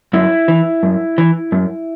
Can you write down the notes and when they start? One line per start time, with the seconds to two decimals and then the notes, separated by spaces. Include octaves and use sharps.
0.13 F#2 E4
0.48 E3
0.83 F#2
1.18 E3
1.52 F#2